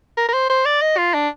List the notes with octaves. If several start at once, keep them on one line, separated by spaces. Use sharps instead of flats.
A#4
A#4
C5
C5
D5
D#5
F4
D4